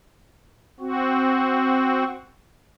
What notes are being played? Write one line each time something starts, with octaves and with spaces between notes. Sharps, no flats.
C4 F#4